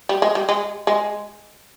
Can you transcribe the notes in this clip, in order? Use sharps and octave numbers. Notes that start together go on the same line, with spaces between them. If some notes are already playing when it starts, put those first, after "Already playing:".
G3
G#3
G3
G#3
G#3